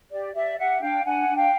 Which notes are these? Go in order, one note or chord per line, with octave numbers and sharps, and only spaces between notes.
G4 D5
G4 D5 E5
G4 E5 F#5
D4 F5 G5
D4 F#5 G#5
D4
F5 G5